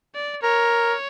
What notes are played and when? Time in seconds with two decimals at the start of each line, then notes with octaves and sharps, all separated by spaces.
0.15 D5
0.43 A#4 C#5